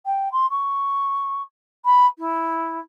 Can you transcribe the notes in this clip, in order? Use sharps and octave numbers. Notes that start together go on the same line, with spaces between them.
G5
C6
C#6
B5
E4